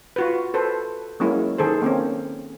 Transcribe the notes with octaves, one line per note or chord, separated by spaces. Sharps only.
F4 F#4 B4
A4 B4 C5
F#3 G#3 A#3 C#4 E4
D#3 G#4 A4 C5
A#3 C4 C#4